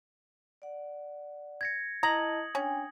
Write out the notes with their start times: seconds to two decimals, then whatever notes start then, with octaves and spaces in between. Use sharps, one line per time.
0.62 D5 F#5
1.61 G#6 A#6 C#7
2.03 E4 D#5 A5 A#5 D#6 G#6 F#7
2.55 C#4 D4 G5 G#5